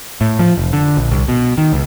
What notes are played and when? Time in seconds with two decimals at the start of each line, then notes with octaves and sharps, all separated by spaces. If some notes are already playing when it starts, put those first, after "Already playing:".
0.21 A2
0.39 F3
0.57 F1
0.73 D3
0.97 A#1
1.11 C2
1.28 B2
1.58 D#3
1.73 C#2